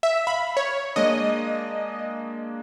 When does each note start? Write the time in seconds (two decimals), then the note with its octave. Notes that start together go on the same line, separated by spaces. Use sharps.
0.03 E5
0.27 F5 B5
0.57 C#5
0.96 G#3 A#3 D4 D#5